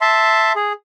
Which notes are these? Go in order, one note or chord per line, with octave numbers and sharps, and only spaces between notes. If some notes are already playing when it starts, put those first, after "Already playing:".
E5 A5 C6
G#4